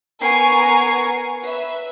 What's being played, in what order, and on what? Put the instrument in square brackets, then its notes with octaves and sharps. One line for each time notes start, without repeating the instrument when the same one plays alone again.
[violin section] B3 A#4 G#5 C#6 C7
B4 E5